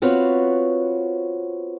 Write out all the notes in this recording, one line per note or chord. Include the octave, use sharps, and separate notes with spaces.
B3 C4 F4 F#4 B4 C#5